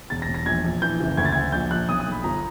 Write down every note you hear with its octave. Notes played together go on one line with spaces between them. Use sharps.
E1 A6
A#6
E1
A#6
A#1 G#6
A#1
E3 G6
F#1
D2 G#6
A6
D2 G#6
A#1 G6
A#1 F#6
B1 D#6
D#6
B1
B5
G1 A#5